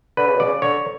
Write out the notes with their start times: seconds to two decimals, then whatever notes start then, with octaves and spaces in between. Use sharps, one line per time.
0.17 D3 B4
0.27 C#3
0.35 B2
0.40 D5
0.46 C#3
0.62 D3 C#5